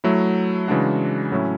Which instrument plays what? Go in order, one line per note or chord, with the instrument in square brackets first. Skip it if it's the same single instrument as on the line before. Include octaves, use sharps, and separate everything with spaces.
[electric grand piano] F#3 A3 E4
C#3 E3 G#3 D4 F#4
A2 F#3 A3 C#4 E4